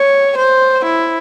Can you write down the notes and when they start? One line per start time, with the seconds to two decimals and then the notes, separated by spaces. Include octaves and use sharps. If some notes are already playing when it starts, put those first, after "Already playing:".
Already playing: C#5
0.38 C5
0.86 E4